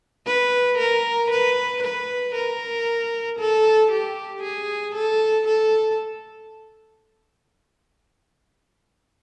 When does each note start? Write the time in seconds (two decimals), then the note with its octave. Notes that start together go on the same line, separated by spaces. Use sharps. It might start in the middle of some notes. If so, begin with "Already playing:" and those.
0.26 B4
0.78 A#4
1.30 B4
1.82 B4
2.35 A#4
3.39 A4
3.91 G4
4.43 G#4
4.95 A4
5.47 A4